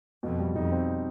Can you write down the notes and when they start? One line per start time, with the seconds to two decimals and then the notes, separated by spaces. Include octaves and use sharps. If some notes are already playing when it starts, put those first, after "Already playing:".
0.23 F2 B2
0.39 G3
0.56 F2 D#4
0.72 C4